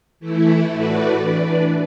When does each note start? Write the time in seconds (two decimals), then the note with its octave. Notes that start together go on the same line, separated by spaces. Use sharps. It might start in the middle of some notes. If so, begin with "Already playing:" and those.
0.20 E3 A3 E4
0.70 A2 A3 F#4 B4 D5
1.20 E3 D4 B4 D5